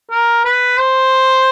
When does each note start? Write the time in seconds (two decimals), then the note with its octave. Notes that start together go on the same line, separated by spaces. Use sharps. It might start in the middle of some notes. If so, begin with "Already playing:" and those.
0.11 A#4
0.45 B4
0.79 C5